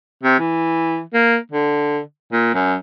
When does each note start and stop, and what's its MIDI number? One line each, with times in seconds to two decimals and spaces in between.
0.23 0.37 48
0.39 1.00 52
1.14 1.38 58
1.52 2.00 50
2.32 2.52 46
2.54 2.75 42